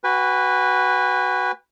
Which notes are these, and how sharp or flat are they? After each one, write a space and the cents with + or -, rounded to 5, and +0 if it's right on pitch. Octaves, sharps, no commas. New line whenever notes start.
F#4 +10 B4 +0 G#5 -45